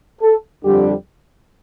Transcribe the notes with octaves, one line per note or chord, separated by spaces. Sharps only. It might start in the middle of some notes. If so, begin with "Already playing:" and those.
A4
F2 D3 G3 G4